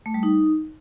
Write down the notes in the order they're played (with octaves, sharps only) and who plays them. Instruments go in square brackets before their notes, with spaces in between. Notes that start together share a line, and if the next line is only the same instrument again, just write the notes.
[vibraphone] A3
G3
D#4